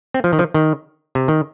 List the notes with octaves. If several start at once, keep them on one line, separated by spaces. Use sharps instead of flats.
C4
F3
D#3
F3
D#3
C3
D#3